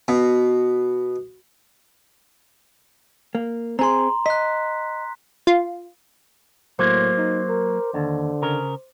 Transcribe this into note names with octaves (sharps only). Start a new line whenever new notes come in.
B2
A#3
C4 G#4 A#5 C6
D#5 F#6 B6
F4
A2 F#3 A#3 C5 C6 D6
D#4
A#4
D#2 D3
C#3 A#4